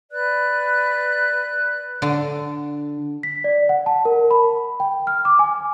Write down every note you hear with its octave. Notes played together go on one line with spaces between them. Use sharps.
B4 D5 F#6
D3
B6
D5
F#5
A5
A#4
B5
G5
F6
D6
G#5